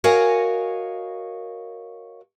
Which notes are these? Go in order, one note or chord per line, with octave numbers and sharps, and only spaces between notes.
F#4 A#4 C#5 D#5 F5 G#5